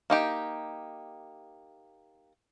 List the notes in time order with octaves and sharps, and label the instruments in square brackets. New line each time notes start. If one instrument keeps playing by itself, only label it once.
[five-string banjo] A#3 D#4 G4